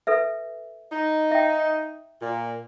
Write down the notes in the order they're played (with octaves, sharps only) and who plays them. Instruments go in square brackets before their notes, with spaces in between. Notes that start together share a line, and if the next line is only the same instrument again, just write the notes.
[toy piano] A4 B4 E5
[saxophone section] D#4
[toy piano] E5 G5
[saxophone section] A#2